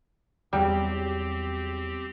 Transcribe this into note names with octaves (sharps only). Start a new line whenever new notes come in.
E2 F#3 G3 C4 G4